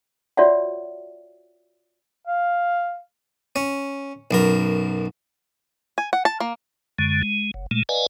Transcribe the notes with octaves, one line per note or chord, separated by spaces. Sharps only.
F4 F#4 C#5 D5 E5 F#5
F5
C#4
B1 F#2 A#4
G#5
F#5
A5
A#3
F#2 D3 G#3
G#3
F#1
A#2 G#3 A3
B4 D5 D#5 F5 G#5